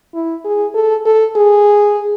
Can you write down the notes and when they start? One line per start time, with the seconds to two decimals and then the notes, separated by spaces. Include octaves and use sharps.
0.14 E4
0.45 G#4
0.75 A4
1.05 A4
1.36 G#4